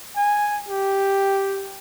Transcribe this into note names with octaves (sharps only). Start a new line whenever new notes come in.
G#5
G4